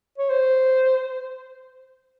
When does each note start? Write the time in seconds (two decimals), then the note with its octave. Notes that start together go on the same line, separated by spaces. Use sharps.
0.18 C#5
0.30 C5